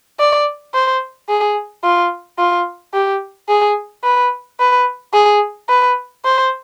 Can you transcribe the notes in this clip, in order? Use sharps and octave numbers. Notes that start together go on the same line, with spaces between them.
D5
C5
G#4
F4
F4
G4
G#4
B4
B4
G#4
B4
C5